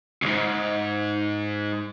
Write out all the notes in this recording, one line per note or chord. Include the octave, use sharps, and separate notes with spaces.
C#2 G#2